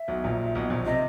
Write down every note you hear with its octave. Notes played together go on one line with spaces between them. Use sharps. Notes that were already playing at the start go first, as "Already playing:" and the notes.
Already playing: E5
B1 B2
A#1 A#2
B1 B2
A#1 A#2
C3 D#5